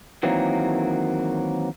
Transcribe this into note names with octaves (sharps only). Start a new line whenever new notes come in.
D#3 E3 F#3 A#3 C4